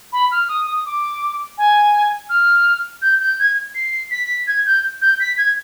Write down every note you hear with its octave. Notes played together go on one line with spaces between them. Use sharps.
B5
F6
D#6
D#6
D6
G#5
F6
G6
G6
G#6
C7
B6
G#6
G6
G6
B6
G#6